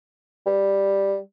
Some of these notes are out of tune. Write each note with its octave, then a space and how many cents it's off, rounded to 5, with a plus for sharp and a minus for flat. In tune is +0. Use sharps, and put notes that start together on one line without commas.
G3 +5